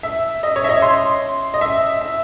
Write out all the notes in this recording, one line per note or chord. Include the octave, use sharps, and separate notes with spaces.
E5
D#5
C#5
E5
D#5
C6
D#5
E5
E5